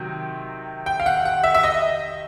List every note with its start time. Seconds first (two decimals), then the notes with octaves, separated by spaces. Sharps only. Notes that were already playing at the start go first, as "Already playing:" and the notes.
Already playing: C3 D#3 F#3
0.86 G5
1.00 F5
1.06 F#5
1.25 F#5
1.44 E5
1.54 E5
1.64 D#5